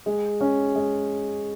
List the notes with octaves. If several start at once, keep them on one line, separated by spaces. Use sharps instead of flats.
G#3
C#4
G#3